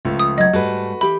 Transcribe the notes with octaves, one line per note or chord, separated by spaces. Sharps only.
C#2 F3 A3
D#6
F#3 D#5 F#5 G#6
G#2 G3 A3 F#4 B4
E3 G4 E5 B5